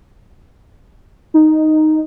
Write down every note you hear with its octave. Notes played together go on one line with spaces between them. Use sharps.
D#4